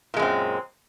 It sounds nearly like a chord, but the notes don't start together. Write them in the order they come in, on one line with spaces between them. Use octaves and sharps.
A#2 G#3 F#2 C4